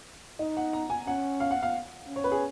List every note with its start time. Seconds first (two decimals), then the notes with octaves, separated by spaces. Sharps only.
0.39 D#4 D#5
0.57 F#5
0.73 A#5
0.90 G#5
1.07 C#4 F#5
1.40 F5
1.51 F#5
1.63 F5
2.07 C#4
2.16 C#5
2.24 B4
2.32 G#4